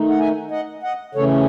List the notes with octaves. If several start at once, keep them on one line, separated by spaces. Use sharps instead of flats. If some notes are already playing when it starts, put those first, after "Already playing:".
Already playing: D#3 A3 D#4
F#5
E5 G#5
D#5 F#5
D#5 F#5
C#3 E3 A3 C#4 A4 C#5